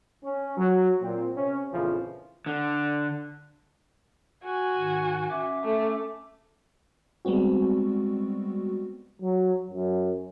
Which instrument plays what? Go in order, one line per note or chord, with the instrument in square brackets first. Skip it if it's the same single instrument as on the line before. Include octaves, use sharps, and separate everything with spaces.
[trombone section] C#4
F#3
A#2 C4
C3 C#4
A#1 F2 A#2 C#3 E3 F3
[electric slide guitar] D3
[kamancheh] F#4 G#5
[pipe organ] G#2 D#3
C#4 E5 D6
[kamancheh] A3 A4
[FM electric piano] G3 G#3 B3 C4 F#4
[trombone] F#3
F#2